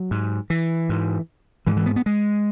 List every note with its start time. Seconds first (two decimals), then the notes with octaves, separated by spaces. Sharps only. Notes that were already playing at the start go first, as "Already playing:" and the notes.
Already playing: F#3
0.11 G#2
0.50 E3
0.89 G#2
1.67 G#2 E3
1.77 E3
1.86 B3
1.96 B3
2.06 G#3